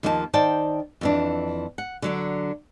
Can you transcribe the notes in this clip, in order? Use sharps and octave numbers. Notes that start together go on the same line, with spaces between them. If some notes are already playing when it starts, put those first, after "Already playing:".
D#2 F3 A#3 D#4 D#5 A5
D#3 C5 D5 G5 A5
F2 E3 D4
F#5
D3 F#3 D5